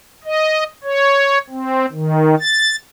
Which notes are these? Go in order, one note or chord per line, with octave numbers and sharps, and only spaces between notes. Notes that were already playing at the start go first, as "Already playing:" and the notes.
D#5
C#5
C4
D#3
A6